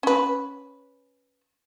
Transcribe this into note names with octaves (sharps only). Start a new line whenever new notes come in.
C#4 B4